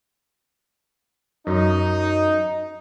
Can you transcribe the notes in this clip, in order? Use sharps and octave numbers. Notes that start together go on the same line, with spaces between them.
F#2 D#4